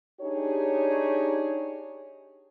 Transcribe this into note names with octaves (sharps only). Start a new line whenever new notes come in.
D4 D#4 G4 G#4 C#5